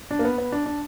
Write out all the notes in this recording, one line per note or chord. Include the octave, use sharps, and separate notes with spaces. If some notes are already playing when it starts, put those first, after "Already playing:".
D4
A#3
B3
B3
D4
D4